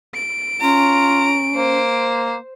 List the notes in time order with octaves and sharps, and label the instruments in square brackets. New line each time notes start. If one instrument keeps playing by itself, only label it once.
[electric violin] D7
[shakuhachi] C#4 [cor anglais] F4 [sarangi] A#5
[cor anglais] A#3 [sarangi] C5